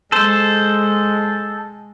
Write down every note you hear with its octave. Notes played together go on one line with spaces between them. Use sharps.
G#3 A4 C5